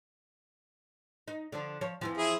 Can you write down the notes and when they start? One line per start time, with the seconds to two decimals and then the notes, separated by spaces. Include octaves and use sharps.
1.28 D#4
1.52 D3 F3 D4
1.81 F3 C#5
2.01 F2 E3 F3
2.18 E4 G#4